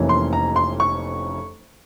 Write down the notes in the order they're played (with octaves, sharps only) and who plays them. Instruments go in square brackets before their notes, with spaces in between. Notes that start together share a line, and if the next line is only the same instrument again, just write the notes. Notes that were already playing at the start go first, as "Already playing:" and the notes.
Already playing: [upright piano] F1 F2 E3 A#3 C#4
C6
A#5
C6
C#6